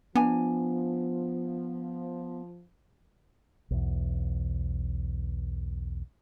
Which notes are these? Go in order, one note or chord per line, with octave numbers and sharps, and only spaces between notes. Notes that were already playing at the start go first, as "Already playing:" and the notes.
F3 B3 D4 G#5
B1 E2